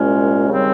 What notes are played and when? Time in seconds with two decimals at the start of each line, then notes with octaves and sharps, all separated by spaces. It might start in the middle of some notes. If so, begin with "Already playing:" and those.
Already playing: C2 A#2 G#3 C#4
0.49 D#2 C#3 G3 C4